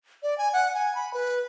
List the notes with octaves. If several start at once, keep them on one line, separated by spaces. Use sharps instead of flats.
D5
G#5
F#5
G#5
B5
B4